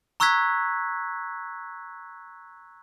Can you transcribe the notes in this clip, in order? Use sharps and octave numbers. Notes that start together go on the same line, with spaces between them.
A#5 C#6 E6 F#6 G#6 B6